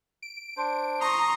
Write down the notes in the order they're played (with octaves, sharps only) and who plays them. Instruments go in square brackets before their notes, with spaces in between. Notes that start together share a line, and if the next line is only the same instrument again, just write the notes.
[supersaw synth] D7
[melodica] D4 C5
[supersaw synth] A#5 C#6 [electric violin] C6 D#6